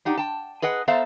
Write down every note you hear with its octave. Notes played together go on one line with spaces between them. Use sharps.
D4 D#4 G4 F#5
G5 A5
G#4 B4 D#5 F#5
B3 A4 C5 E5 F5 A#5